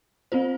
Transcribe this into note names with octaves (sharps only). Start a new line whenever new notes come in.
C4 F4 C5